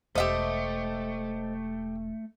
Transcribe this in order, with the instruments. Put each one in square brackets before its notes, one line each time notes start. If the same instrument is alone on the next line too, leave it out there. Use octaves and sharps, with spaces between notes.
[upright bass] E1 [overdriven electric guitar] A3 [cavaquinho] G4 E5 D#6 [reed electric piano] C5 D#5